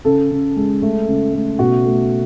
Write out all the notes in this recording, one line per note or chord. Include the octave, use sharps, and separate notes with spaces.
C#3 A4
C#3
G#3
A3
C#3
A3
B2 F#4
A3